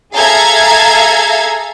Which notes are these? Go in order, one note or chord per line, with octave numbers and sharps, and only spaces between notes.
G#4 A4 E5 F5 A#5 G#6